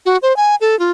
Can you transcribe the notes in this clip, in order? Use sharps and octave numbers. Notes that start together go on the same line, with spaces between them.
F#4
C5
G#5
A4
F4